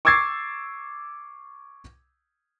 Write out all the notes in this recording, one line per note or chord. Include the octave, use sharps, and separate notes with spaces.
C#6 D6 E6 G#6 A6 C7